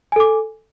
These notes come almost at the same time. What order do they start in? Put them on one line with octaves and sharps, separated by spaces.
G#5 A4 D6